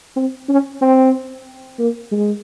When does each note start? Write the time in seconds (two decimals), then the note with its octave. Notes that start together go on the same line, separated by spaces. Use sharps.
0.16 C4
0.49 C#4
0.81 C4
1.79 A#3
2.11 G#3